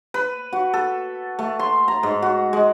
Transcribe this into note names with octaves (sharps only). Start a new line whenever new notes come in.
B4
F#4
A4
A3
C6
A#5
G#2
F#4
G#3